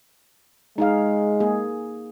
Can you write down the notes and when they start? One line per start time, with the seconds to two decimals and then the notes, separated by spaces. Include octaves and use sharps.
0.78 G#3 D#4 G#4 F5
1.40 A#3 G#4